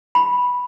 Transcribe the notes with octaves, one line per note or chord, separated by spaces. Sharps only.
B5